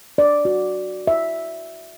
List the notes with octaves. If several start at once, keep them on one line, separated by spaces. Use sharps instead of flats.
D5
F#4
E5